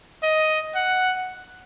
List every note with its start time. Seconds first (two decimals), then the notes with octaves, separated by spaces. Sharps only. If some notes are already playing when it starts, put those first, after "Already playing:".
0.23 D#5
0.75 F#5